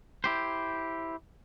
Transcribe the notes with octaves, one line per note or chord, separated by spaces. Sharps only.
E4 G4 C5